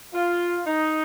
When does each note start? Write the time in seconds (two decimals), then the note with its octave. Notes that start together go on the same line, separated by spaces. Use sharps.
0.14 F4
0.66 D#4